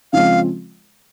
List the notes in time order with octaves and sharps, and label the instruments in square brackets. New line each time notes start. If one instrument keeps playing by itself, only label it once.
[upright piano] C#3 F3 G#3 C4 [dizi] F5